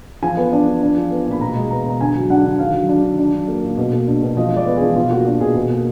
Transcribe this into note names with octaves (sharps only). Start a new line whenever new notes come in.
F3 G#5
B3
D4
F3
D4
F3
B3
A#2 B5
B2 A#5
G#3
B3 A#5
B2 A#5
D3 G#5
F#3
D4 F#5
D3
D#3 F5
F#3
D4
D#3
D4
F#3
A#3
A#2
B2
A#3
D4
B2
F3 D#5
G#3 D5
B3
F3 G#4
B2 F4
A#3 F#4
D4 F#4
B2 G#4
B2 G#4
A#3